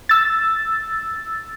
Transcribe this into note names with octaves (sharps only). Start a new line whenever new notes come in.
E6 A6